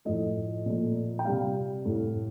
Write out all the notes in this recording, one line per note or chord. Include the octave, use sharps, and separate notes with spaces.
A2 F3 A3 D#5
A#2 F3 A3
G5
C3 G3 F5
A2 A3